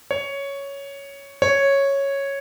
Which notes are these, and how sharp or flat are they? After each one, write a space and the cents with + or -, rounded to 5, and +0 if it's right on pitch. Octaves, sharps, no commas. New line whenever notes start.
C#5 +5
C#5 -5